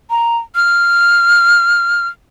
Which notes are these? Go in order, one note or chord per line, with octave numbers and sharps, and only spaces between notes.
A#5
F6